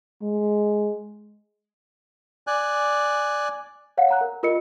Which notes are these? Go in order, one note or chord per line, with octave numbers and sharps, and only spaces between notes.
G#3
D5 G#5 F#6
C#5 F5 F#5
F#5 A#5 F#6
A#4
F4 A#4 D#5 C#7